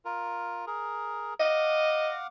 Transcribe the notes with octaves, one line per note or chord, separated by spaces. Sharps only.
F4 A#4
G#4 A#4
D#5 F5 F#5 D6